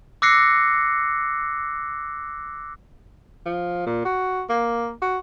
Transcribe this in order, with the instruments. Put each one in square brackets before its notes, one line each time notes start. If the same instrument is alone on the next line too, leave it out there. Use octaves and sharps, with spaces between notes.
[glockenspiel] D6 E6 F#6 A#6 C7 C#7
[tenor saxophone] F3
A#2
F#4
A#3
F#4